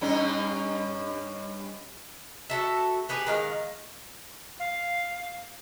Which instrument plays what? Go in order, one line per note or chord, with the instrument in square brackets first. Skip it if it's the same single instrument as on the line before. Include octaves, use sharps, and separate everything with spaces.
[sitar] G2 C#4 D#4
[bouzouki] F#4 A4 E5
B3 G4 G#4 B4
D#3 G#3 F5
[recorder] F5